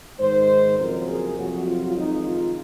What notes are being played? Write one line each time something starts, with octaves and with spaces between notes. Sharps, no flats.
G#2 D#3 G#3 C5
F2 C#3 F#3 A#3 A#4
G#4
F2 C3 F#3 F#4
F4
F2 C3 D#3 G#3 D#4
F4